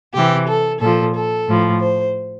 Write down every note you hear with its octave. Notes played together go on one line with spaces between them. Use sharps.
C3 E3 G4
A4
A#2 F3 A4
A4
A2 F3
C5